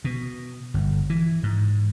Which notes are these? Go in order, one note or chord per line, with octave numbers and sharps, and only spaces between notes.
B2
G1
E3
G#2